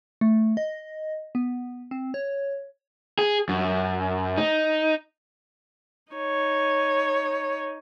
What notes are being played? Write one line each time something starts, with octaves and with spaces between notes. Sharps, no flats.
A3
D#5
B3
C4
C#5
G#4
F#2
D#4
D#4 C#5